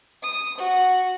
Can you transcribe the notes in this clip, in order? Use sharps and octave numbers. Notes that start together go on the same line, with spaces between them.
D#6
F#4